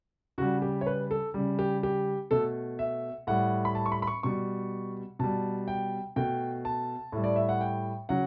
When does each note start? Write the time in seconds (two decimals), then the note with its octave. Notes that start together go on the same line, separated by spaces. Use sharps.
0.38 C#3 G3 F#4
0.62 G4
0.81 C#5
0.87 B4
1.11 A4
1.34 C#3 G3
1.59 G4
1.83 G4
2.31 B2 A3 A4
2.79 E5
3.27 A2 G3 F#5
3.65 B5
3.75 A5
3.86 C#6
3.92 B5
4.02 B5
4.07 C#6
4.23 B2 G3 C#6
5.19 B2 G3 A5
5.68 G5
6.16 B2 A3 G5
6.65 A5
7.12 A2 G3
7.24 D5
7.36 E5
7.49 F#5
7.61 G5
8.09 C#3 F#3 F#5